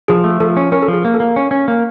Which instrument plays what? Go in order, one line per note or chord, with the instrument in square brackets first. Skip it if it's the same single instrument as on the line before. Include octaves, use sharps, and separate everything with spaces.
[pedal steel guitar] F3 [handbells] G#4
[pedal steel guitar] A3
[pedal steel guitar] F3 [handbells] A4
[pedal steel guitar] C#4
[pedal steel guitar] C#4 [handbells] A#4
[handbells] A4
[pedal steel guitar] F3
[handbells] G#4
[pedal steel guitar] A#3
[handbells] A4
[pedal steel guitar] A#3
C#4
C#4
A#3